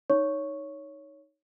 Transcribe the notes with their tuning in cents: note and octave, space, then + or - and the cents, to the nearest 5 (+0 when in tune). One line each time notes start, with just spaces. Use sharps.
D#4 +0 C#5 +10 C#6 +0